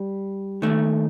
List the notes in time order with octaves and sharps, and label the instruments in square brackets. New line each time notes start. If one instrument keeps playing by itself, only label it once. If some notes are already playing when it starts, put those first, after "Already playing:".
Already playing: [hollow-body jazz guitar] G3
D#2 D#3 A3